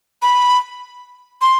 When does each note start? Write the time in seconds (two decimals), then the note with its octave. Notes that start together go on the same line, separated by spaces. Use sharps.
0.22 B5
1.42 C6